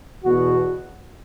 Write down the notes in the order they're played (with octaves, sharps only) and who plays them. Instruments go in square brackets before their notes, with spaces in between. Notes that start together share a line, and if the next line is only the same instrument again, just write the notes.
[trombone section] E2 B2 F#4